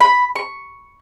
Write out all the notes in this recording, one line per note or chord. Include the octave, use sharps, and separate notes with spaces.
B5
C#6